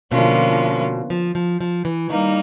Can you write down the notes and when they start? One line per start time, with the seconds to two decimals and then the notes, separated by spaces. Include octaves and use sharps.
0.11 B2 D3 F3 A#3 C#4 F4
1.10 F3
1.35 F3
1.61 F3
1.85 E3
2.09 D#3 G3 A#3 D#4